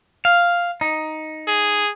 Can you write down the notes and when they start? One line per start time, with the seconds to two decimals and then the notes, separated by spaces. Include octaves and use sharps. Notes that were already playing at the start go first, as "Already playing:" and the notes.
0.25 F5
0.81 D#4
1.47 G#4